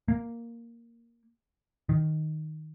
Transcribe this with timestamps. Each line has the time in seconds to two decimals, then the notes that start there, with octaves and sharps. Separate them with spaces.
0.08 A#3
1.89 D#3